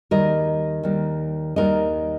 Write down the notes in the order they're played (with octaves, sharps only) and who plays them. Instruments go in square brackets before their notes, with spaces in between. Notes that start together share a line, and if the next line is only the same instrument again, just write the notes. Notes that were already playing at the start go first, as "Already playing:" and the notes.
[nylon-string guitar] D#2 D#3 G3 A#4 D#5
D#2 D#3 G3
D#2 D#3 G3 A#4 D#5